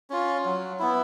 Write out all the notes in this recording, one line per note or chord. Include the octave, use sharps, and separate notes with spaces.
C#4 F4
F#3
B3 E4